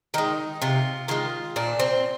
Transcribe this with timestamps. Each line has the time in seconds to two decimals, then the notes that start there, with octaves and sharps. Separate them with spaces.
0.14 D#3 G#3 D#4
0.62 C3 F4
1.08 D#3 G#3 F4
1.56 A#2 D4
1.79 C4